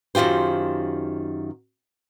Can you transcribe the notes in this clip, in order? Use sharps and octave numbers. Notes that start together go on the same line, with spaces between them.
F#2 D#3 F4 G4 C5